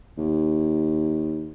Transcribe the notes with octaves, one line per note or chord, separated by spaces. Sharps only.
D#2